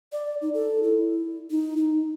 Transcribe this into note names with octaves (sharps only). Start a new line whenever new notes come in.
D5
D#4
A4
E4
D#4
D#4